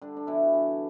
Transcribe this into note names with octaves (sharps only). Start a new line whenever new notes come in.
D3 G3 D4
D4
B2 E3 E4
D3